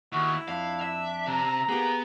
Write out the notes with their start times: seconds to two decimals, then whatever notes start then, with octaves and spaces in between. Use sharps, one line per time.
0.13 D#2 E4 F#4
0.48 F2 D4 F5
0.81 E5
1.27 C3 A#5
1.69 A#3 B3 G4 G#4